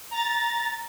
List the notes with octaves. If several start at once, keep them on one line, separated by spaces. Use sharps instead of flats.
A#5 A6